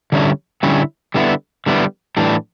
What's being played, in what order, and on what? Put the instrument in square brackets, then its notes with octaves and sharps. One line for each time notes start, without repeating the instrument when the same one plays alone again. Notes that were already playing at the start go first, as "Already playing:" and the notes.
[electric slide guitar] D3 G3 C#4 E4
D3 G3 C#4 E4
D3 G3 B3 E4
D3 G3 B3 E4
A2 E3 G3 D4